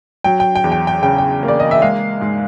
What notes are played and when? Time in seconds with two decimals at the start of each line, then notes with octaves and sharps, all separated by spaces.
0.24 F#3 G5
0.40 G5
0.55 G5
0.64 E2
0.72 G5
0.87 G5
1.03 C#3 G5
1.18 G5
1.43 A#3
1.48 D5
1.60 D#5
1.71 E5
1.82 G#3 F5
2.21 G#2